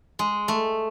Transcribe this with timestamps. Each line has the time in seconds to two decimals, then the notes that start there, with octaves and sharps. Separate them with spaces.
0.19 G#3
0.48 A3